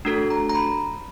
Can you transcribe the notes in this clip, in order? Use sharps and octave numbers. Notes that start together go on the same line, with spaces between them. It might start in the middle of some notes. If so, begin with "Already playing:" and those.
A3 D4 F#4 A4
A#5
A#5
B5